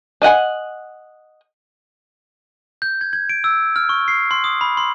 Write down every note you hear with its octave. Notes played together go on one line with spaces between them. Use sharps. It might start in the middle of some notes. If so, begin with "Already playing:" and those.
D4 D#5 F#5 G#5
G6
G#6
G#6
D7
E6
F6
C#6
C7
C6
D#6
B5
C6